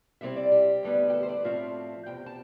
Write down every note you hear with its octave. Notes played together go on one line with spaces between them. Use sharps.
C3 G3 C4 E4 E5
D5
G4
D2 D3 G3 B3 E4
G4
A4
C5
D5
A2 F3 C4 F4 E5
E2 C3 G5
A5